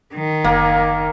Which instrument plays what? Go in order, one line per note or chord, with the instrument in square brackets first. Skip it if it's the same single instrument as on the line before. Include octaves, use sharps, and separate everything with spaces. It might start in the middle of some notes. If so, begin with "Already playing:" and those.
[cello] D#3
[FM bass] F#1 [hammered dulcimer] A#3